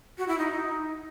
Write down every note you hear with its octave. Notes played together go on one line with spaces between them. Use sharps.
F#4
E4
D#4